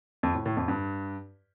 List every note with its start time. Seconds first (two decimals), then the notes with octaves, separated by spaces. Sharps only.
0.23 F2
0.34 A2
0.46 A2
0.57 F2
0.68 G2